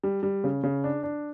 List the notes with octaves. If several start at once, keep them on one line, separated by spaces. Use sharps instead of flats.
G3
G3
C#3
C#3
D4
D4